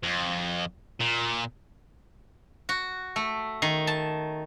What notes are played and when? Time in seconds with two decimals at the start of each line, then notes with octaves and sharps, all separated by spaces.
0.03 F2
1.00 A#2
2.69 F#4
3.16 A3
3.62 D#3
3.87 A5